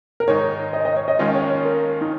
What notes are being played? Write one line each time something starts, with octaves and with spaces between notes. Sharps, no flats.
A#4
G#2 D#3 G#3 D#4 C#5
D#5
D#5
C#5
D#5
D#2 D#3 G#3 C#4 F4 D#5
C#5
C#5
A#4
D#4